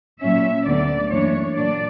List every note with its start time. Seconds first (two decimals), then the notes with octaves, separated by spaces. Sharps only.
0.20 A#2 F#3 C#4 E5
0.65 D2 D3 F#3 B3 D5
1.10 F#2 E3 A#3 D4 C#5
1.56 A#2 F#3 A#3 D4 D5